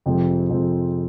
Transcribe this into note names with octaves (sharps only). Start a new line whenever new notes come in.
F2 C3 F3 G#3 C4
F2 C3 F3 G#3 C4